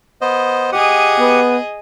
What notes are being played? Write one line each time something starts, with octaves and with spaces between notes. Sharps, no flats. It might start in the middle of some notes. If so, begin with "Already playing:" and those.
B3 C5 D#5
G4 G#4 D#5 F#5
B3